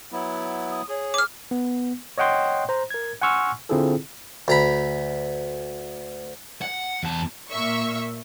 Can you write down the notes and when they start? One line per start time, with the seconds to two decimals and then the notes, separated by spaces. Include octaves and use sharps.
0.12 F#3 B3 E4
0.71 D#6
0.89 G#4 C#5
1.14 D6 F6
1.51 B3
2.18 C#5 D#5 F#5 G5 C6
2.69 C5 A#5
2.90 A#4 G#6
3.22 F#5 G#5 C6 C#6 E6 F6
3.69 D3 C4 E4 F4 G#4 A4
4.48 D2 A#5 B5
6.62 F#5
7.03 E2 A5
7.51 A#2 A#3 E5 C#6